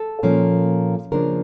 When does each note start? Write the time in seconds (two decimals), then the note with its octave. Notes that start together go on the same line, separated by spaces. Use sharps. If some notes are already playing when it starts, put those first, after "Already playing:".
Already playing: A4
0.23 A#2 F3 A#3 C#4
1.11 C#3 F3 A#3 D4 A#4